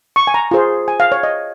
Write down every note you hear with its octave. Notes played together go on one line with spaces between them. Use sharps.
C#6
G#5
A#5
F4 G#4 C5
G#5
F5
C#5
D#5